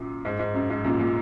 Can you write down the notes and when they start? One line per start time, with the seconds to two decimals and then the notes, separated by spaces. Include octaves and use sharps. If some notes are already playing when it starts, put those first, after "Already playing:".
Already playing: F#2 A#2
0.25 G#2
0.39 G#2
0.54 F#2
0.70 G#2
0.84 F#2 A#2
0.99 A#2